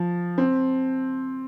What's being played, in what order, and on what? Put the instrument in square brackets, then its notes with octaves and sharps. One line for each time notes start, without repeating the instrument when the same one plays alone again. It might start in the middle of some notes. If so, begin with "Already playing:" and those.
Already playing: [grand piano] F3
C4